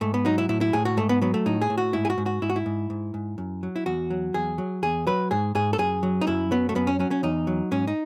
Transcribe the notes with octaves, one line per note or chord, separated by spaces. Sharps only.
G#2 A3
B3
F#3 D#4
E4
A2 E4
E4
A2 G#4
F#4
G#2 A3
B3
F#3 B3
A3
A2 D#4
G#4
A2
F#4
G#2 E4
G#4
F#4
G#2
F#4
G#2 E4
F#4
E4
G#2
G#2
G#2
F#2
F#3
E4
E2 F#4
F#3
E2 G#4
F#3
E2 G#4
F#3 B4
G#2 G#4
G#2 G#4
A4
F#2 G#4
F#3
D#4
F#2 E4
F#3 B3
A3
F#2 B3
C#4
F#3 C#4
C#4
E2 D#4
F#3
G#2 C#4
D#4